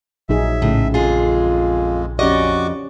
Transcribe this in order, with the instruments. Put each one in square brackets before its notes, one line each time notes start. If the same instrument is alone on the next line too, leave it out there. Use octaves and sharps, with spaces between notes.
[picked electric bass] A#1 [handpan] F#3 D#4 G#4 [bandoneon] E5
[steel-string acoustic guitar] A2 [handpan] C#3
[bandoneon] F2 G#3 [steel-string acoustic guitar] F4 G#4
[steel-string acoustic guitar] F2 D#5 [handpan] C#4 G4 D5 [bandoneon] F#4 C#6 D6